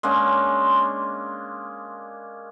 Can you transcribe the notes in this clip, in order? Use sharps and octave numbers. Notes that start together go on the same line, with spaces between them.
G#3 A#3 C#4 D4